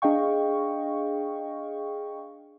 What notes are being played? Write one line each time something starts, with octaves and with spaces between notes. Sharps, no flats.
D4 G#4 D#5 F5 G5 C#6